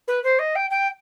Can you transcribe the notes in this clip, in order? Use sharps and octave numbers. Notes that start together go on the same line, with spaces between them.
B4
C5
D#5
G5
G5